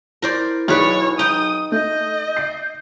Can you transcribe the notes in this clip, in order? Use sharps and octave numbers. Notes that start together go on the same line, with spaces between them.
E4 A#4 C5 D5
B1 G#4 B4 C#5 D5
D#4 G5 D#6
A3 D#5 G6
C7